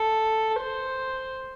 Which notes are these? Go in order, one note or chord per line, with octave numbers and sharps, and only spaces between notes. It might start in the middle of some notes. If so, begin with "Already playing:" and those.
Already playing: A4
C5